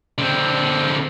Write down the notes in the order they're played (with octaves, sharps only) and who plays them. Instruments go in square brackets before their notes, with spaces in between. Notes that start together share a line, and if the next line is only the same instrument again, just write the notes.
[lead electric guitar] D3 C4